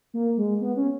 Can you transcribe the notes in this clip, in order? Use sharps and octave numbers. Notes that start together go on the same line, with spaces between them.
A#3
G#3
B3
C#4